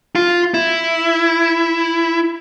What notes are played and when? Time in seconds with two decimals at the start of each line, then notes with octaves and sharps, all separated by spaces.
0.16 F4
0.54 E4